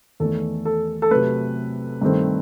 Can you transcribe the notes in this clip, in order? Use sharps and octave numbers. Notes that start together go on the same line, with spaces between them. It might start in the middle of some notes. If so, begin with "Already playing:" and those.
E2 D#3 A3 A4
A4
A4
C3 F#3 A3 B4
G2 D#3 A3 C4